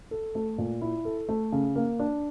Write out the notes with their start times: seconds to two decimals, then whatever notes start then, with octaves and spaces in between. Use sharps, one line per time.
0.11 A4
0.35 A3
0.58 A#2
0.82 E4
1.05 A4
1.29 A3
1.52 C#3
1.76 A#3
1.99 D4